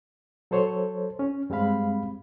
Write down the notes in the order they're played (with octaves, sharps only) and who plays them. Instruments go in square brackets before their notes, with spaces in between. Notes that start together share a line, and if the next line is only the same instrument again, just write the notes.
[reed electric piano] F#3 A4 C5 C#5
C#4
G2 G3 G#3 C4 F5 B5